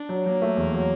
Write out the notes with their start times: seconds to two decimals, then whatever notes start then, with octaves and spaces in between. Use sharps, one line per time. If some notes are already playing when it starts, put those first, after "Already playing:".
Already playing: D4
0.09 F#3
0.25 F#3 A#3
0.42 A3
0.57 E2
0.73 F#3